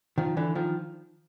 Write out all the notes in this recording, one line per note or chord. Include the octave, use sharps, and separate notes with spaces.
D#3 F3
D3 E3
D#3 F3